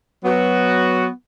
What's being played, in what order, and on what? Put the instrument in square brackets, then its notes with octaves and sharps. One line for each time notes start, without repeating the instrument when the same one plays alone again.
[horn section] F#3 B3 F#4